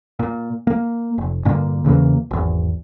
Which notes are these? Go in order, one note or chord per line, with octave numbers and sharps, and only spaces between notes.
A#2
A#3
F1
G2 A#2 D3 A#3
E2 C#3 E3 A#3
G#1 E2